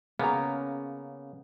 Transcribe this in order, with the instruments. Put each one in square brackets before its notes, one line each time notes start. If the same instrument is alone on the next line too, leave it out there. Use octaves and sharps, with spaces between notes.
[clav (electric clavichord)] C#3 A#3 B3 [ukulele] C#4 A#5